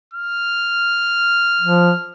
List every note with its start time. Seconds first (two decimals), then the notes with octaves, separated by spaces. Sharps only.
0.14 F6
1.61 F3